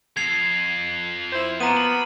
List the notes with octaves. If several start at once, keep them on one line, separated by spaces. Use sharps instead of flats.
F2 G#6 C7 F7
E4 C5
F3 A#3 B3 A#5 D#7
B5